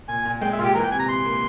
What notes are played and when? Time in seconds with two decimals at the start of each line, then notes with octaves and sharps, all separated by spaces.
0.08 A#2 G#5
0.25 A#2
0.41 G#3 G5
0.53 E5
0.59 A#2 F4
0.64 G4
0.74 E3 A#4
0.84 G5
0.91 C3 G#5
0.99 A#5
1.08 C3 C6
1.25 A#3